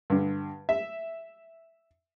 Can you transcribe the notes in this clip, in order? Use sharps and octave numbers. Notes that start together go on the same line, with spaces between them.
G2 D3
E5